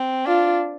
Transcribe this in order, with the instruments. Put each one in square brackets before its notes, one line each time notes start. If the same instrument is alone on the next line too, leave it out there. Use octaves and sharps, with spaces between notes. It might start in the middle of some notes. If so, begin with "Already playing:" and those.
Already playing: [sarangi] C4
[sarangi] D4 [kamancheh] F4